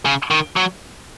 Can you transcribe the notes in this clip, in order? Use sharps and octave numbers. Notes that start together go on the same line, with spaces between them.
C#3
D#3
F#3